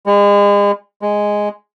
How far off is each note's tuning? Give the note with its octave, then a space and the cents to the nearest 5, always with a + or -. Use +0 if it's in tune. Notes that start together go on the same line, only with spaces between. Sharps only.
G#3 -40
G#3 -5